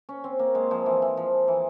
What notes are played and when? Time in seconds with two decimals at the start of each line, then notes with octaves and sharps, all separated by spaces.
0.09 C#4
0.24 C4
0.39 A#3
0.55 G#3
0.71 F3
0.86 E3
1.02 E3
1.17 F3
1.48 E3